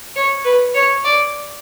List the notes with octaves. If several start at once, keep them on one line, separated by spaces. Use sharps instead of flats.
C#5
B4
C#5
D5